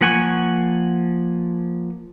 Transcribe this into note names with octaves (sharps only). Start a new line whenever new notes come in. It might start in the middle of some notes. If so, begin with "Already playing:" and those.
F3 A#3 F#5 G#5 C#6